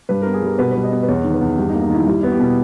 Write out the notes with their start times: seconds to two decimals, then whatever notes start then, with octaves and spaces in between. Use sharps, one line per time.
0.09 G2 B4
0.22 B3 A#4
0.34 G#4
0.42 G3 A#4
0.58 B2 B4
0.72 G3 B4
0.84 D#5
0.92 B3
1.03 B4
1.08 E2 C#5
1.24 D#3
1.33 B4
1.41 E2
1.58 G2 G4
1.69 D#4
1.74 A#3
1.81 D#4
1.90 D#3 E4
2.06 G3 E4
2.21 B3 E4
2.31 G4
2.39 B2